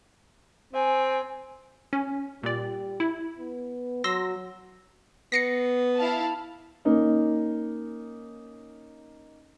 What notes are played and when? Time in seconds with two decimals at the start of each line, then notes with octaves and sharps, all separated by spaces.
0.73 C4 G#5
1.93 C#4
2.43 A#2 G3 D5
3.00 E4
3.38 B3
4.04 F#3 C6 E6 A#6
5.32 B3 A#6 C7 C#7
5.98 E4 F5 A5
6.85 A#3 C#4 D#4